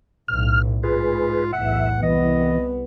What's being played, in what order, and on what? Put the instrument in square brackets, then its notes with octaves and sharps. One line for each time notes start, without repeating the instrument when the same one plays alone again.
[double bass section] B1 A2 [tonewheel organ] F6
[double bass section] G#2 [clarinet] F4 [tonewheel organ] G#4 B4
[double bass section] B1 E2 A2 [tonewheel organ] E5 [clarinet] F#5
[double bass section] C2 B3 [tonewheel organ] E3 [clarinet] D#5